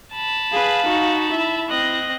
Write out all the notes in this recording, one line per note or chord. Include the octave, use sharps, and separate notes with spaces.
A5 B5
G#4 B4 F5
D#4 F#4
E4 E5
C4 D#5 F#6 A#6